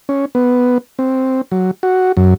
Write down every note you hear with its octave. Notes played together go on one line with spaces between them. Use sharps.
C#4
B3
C4
F#3
F#4
F#2